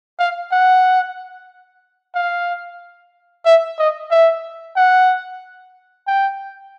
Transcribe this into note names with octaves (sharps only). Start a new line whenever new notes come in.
F5
F#5
F5
E5
D#5
E5
F#5
G5